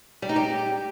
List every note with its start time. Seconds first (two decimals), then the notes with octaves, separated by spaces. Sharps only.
0.22 G3
0.29 D#4
0.36 G4